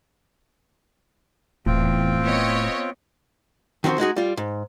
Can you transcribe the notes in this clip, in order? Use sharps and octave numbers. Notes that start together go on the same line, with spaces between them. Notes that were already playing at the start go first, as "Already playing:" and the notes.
D#1 E2 A2 C4 F4 G5
B3 C#5 D#5
D#3 F3 C4 F#4 C5
G#3 D#4 F#4 G#4
G3 F4
G#2